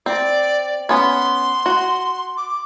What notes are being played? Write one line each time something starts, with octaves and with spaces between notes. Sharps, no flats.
C4 D5
B3 C#4 C6
F#4
D6